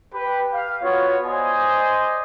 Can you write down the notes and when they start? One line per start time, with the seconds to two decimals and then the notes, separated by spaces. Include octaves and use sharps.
0.13 G4 B4
0.52 F5
0.82 B3 F4 F#4 C#5
1.25 C5 D5 D#5 G#5 C6